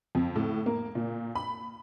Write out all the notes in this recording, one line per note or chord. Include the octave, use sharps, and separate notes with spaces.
F2
A2
A#3
A#2
B5